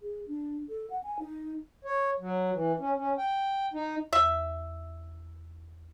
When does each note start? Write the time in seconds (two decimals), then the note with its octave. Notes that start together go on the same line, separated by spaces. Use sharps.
0.01 G#4
0.28 D4
0.69 A4
0.90 F#5
1.04 G#5
1.19 D#4
1.85 C#5
2.20 F#3
2.53 E3
2.80 C#4
2.98 C#4
3.18 G5
3.74 D#4
4.13 E2 E5